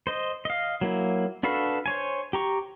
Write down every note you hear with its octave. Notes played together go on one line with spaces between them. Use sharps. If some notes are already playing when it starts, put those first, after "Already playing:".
C5 D#5
D#5 F5
F#3 A#3 E4
D4 F#4 A4 B4 F5
C5 C#5 G#5
G4 A#5 C#6